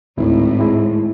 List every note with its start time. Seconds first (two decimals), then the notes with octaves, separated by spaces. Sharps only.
0.18 G#1 D2 A2 E4
0.60 G#3 E4